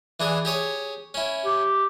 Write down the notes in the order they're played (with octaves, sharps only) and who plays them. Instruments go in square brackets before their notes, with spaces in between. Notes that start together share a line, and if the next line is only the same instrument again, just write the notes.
[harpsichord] E3 D4 G#4
G4 G#4 C#5
C#4 E4
[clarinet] G4